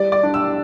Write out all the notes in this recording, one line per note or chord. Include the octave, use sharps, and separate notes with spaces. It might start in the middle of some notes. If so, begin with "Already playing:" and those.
Already playing: G3 D5
D5
D4
E6